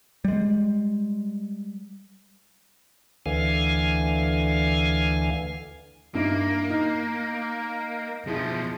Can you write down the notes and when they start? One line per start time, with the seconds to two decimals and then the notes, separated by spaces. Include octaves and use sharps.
0.25 G3 G#3
3.26 D2 D3 E3 F5 G#5
6.15 G2 A#3 D#4 E4
6.70 D#4
8.27 B2 F3 E4 G#4